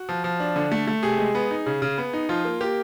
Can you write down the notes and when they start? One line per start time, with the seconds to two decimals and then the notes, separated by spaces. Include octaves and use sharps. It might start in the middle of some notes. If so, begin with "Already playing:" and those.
Already playing: F#4
0.09 F3
0.24 F3
0.40 D4
0.56 D3
0.72 A3
0.87 A3
1.03 C3 G#4
1.19 G#3
1.35 B3
1.51 D#4
1.66 C#3
1.82 C#3
1.98 B3
2.14 D#4
2.29 F3 F4
2.45 A#3
2.61 A#3 G4